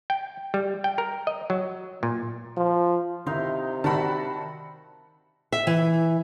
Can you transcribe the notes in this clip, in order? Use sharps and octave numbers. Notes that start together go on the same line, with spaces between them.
G5
G3
G5
A#4
D#5
F#3
A#2
F3
C3 D#3 D#4 E4 F5 C6
D#3 G3 F#4 E5 A5 B5
E5
E3